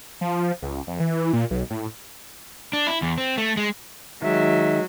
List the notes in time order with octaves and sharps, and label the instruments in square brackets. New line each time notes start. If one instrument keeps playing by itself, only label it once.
[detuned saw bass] F3
C#2
F2
E3
A#2
B1
A2
[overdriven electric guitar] D4
E4
E2
C4
A3
G#3
[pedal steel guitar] D#3 [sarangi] F#3 [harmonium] G#3 [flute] E5